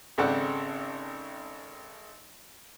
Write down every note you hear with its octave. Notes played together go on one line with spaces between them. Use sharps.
G#1 C#3 C4 A4 D5 F#5